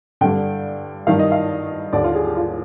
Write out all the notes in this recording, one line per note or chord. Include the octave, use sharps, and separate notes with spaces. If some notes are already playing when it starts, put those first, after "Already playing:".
G2 D3 G5
G2 D#3 F5
D#5
F5
D#2 D3 D5
F4
G#4
G4
F4